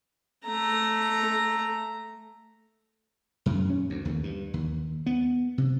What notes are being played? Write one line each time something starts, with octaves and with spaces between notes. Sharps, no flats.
A3 A#5
F#2
C#4
D2
D#2
G2
D#2
B3
C3